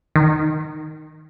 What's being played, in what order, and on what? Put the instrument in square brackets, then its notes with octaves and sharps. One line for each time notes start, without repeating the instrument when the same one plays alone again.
[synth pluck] D#3